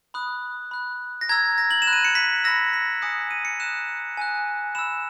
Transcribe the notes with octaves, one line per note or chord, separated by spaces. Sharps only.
B5 D#6 F#6
B5 F#6
A#6
A#5 E6 G#6
A#6
F#7
E7
B5 F#6
D#7
C#7
B6
B5 E6 A#6
B6
G#5 D#6 F#6 C#7
D#7
C#7
A#5 D#6 F#6 E7
G#5 D#6 F#6
B5 E6 E7